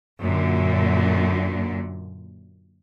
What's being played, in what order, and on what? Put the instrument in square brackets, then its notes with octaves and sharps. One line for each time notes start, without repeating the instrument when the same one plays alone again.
[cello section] F#2 A#2 D3